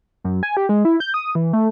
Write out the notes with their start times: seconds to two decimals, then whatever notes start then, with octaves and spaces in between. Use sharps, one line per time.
0.24 F#2
0.43 G#5
0.57 G4
0.69 G#3
0.85 E4
1.00 G6
1.14 D#6
1.35 E3
1.53 A3